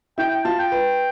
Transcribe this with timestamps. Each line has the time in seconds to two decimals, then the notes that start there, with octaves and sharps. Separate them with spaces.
0.18 E4 G5
0.31 G5
0.45 F4 A5
0.59 G5
0.72 B4